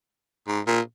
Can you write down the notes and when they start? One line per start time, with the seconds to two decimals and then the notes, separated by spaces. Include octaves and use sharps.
0.47 G#2
0.67 A#2